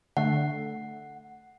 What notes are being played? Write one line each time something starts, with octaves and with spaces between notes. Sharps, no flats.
D3 A3 F#5